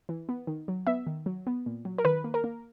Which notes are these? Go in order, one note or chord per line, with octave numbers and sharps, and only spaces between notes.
E3
B3
D#3
F#3
B3 E5
D#3
F#3
B3
A#2
F#3
A#4
D#3 B4
A#3
A#4
A#3